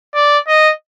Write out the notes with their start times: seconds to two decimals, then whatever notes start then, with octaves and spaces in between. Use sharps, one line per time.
0.14 D5
0.48 D#5